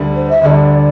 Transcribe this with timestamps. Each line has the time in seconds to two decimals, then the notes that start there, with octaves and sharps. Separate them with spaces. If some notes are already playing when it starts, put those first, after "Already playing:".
Already playing: D2 D3 G3
0.16 C5
0.30 E5
0.41 D2 D3 G3 D5 E5